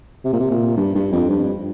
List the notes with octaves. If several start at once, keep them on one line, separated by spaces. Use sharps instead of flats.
C3
A#2
C3
A#2
G2
G2
F2
G2